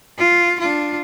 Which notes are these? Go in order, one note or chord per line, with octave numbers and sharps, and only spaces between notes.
F4
D4 F4